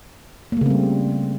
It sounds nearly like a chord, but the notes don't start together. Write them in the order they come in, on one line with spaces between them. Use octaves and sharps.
A#3 A3 C#3 C4 G3